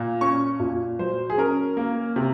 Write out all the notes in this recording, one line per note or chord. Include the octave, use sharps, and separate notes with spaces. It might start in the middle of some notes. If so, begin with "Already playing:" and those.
Already playing: A#2
C#4 C#6
A#2
F#3 C5
G#4
C#4 A#4
A#3
C3